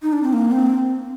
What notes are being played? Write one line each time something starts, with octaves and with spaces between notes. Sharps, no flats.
D#4
D4
C4
A#3
C4